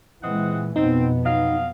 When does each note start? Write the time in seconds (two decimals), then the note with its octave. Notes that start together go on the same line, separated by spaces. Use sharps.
0.23 A#2 E3 G#3 C4 D#5 F#5
0.76 F2 B2 B3 C4 D#4
1.25 F#3 D#5 F5